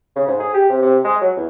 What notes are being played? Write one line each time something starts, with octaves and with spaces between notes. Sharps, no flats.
C#3
G#2
G#4
G4
C3
C3
G#3
F#3
E2